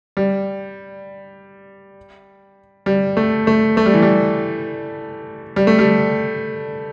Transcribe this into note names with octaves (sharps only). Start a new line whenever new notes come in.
G3
G3
A3
A3
A3
G3
E3
G3
G3
A3
G3